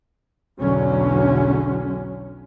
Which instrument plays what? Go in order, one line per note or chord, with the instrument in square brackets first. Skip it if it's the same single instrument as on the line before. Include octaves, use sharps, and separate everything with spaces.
[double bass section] B1 E2 D3 F#3 C#4